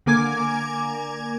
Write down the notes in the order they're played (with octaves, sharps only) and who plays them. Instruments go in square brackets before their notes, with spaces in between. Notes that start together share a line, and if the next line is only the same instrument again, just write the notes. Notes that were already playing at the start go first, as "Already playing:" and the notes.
[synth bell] D3 A#3 A#4 G#5 D6 G#6